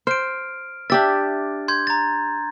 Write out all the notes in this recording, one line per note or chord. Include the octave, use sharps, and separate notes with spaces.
C5 F6 D7
D4 G4 E5 A6
C6 G6 G#6
A#5 A6